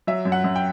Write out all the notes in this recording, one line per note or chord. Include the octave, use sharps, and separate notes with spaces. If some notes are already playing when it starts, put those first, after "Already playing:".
F#3 E5
F#2
F#5
F#2
G5